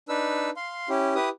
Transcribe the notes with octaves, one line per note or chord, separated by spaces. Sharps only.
D4 D#4 B4 E6
F5 C6
C#4 E4 G4
E4 G4 B4 D#6